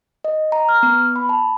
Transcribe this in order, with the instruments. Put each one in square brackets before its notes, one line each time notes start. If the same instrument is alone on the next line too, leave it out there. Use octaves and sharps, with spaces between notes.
[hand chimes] D#5
A#5
F6
B3
B5
A5